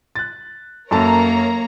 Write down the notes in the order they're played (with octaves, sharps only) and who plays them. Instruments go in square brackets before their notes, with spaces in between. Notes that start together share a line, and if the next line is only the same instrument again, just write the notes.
[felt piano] F#6 A6
[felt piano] F#2 A4 A5 [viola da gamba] A#3 [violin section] A#4 C#5 A#5